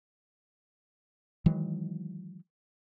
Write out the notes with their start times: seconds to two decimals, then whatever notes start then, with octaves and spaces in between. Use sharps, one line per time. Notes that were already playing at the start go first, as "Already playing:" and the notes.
1.46 D#3 E3 F#3 G#3